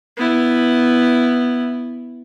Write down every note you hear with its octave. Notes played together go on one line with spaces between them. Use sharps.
B3 E4